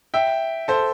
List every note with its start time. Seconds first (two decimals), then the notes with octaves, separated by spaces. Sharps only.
0.14 E5 G5
0.68 A4 C5